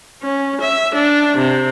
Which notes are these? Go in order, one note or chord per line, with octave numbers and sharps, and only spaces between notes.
C#4
E5
D4
C3